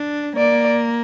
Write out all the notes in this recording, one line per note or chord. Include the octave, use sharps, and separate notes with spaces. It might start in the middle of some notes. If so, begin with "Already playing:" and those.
Already playing: D4
A#3 D5